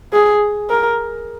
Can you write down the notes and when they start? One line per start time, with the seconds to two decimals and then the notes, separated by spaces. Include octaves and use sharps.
0.13 G#4
0.70 A#4